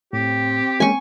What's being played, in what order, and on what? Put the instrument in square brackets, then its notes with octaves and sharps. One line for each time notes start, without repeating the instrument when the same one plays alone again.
[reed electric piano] A2 [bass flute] C4 [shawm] G4
[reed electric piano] G#3 A#3 C#4 [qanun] G#5 C#6